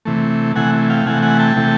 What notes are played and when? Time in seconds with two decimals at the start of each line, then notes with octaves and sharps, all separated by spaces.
0.05 C3 E3 A3
0.56 C3 E3 A3 F#5 G#5
0.90 F5 G5
1.06 C3 E3 A3 F#5 G#5
1.23 F#5 G#5
1.39 G5 A5
1.56 C3 E3 A3